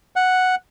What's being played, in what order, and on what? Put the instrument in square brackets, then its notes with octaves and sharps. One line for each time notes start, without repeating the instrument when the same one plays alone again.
[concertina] F#5